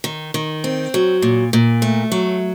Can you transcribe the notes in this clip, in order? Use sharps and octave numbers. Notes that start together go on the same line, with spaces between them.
D#3
D#3
C4
F#3
A#2
A#2
A3
F#3